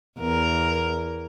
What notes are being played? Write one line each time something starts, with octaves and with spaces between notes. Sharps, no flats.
E2 A#4